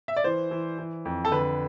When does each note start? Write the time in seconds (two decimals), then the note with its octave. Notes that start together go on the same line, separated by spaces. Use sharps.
0.08 E5
0.16 D5
0.24 E3 C5
0.51 E3
0.79 E3
1.05 F2
1.25 A4
1.31 D3 B4